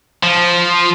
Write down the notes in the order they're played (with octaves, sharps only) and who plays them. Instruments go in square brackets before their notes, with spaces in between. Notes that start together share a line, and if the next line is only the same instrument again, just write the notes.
[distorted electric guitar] F3